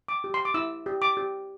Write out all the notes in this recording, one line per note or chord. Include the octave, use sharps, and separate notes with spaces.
D6
G4
C6
D6
E4 E6
G4
D6
G4